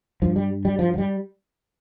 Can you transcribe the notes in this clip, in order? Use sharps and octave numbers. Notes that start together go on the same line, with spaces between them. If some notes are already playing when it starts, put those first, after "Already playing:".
G2 F3
G3
G3
F3
F3
G3